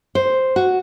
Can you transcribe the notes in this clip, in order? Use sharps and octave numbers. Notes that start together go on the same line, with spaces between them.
C5
F#4